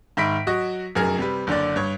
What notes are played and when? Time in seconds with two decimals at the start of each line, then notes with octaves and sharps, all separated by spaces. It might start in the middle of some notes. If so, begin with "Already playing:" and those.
0.17 G#2 D#3 E5 B5 B6 D7
0.47 F#3 F#4 D#5
0.95 F1 F#2 G#4 A#4
1.18 C3 G3 B4
1.47 F#1 D3 D4 D5
1.76 G2 C#5 C#6